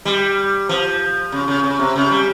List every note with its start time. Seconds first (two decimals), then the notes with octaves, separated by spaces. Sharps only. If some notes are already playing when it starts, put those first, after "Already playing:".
0.05 G3
0.69 F3
1.32 C#3
1.48 C#3
1.64 C#3
1.80 C3
1.96 C#3
2.11 G3